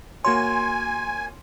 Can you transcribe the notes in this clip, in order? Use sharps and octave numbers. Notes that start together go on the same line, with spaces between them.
A#3 F#4 C#5 G#5 C6